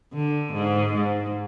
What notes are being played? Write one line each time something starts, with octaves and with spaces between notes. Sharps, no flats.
D3
G#2
G#2